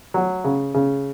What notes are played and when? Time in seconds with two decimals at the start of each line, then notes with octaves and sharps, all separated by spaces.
0.14 F#3
0.44 C#3
0.74 C#3